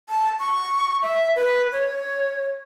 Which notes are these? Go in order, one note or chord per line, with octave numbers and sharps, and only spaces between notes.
A5
C#6
E5
B4
C#5